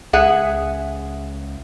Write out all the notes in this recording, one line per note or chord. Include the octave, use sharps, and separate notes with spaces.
C#2 G#4 E5 F#5